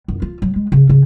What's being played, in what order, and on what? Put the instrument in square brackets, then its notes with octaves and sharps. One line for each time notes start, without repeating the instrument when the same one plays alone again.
[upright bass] F#2
F4
F#3
G#3
C#3
C#3